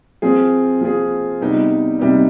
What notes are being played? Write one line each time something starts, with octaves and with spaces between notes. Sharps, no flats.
F3 C4 F4 G#4
F3 C4 F4 G#4
C3 G3 B3 D#4
C3 G3 B3 D#4